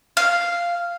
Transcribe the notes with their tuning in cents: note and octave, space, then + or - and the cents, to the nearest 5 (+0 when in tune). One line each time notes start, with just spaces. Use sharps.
F5 -5